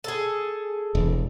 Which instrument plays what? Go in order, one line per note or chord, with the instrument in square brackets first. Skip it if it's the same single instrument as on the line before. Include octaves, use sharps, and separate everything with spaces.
[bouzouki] G#4 A4
[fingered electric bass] E1